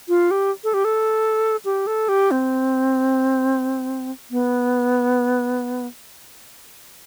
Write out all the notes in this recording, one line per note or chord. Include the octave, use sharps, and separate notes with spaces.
F4
G4
A4
G4
A4
G4
A4
G4
C4
B3